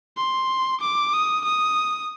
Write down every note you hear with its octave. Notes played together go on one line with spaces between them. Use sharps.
C6
D6
D#6
D#6